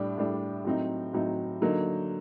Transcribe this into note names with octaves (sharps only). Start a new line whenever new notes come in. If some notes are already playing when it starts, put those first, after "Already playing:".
Already playing: A2 G3 D4
A2 G3 D4
A2 F#3 C4 D#4
A2 F#3 C4 D#4
D3 F#3 A#3 D#4